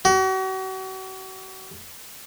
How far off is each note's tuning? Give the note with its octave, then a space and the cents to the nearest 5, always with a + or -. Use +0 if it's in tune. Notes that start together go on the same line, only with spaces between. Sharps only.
F#4 +40